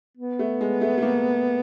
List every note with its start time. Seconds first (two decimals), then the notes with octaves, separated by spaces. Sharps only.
0.18 B3
0.39 A3
0.61 G#3
0.81 A3
0.98 A3
1.02 A#3